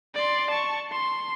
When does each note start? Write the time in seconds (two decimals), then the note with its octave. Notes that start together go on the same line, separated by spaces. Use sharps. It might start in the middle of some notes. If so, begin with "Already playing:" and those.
0.15 D5 C6
0.51 A5 C#6
0.92 C6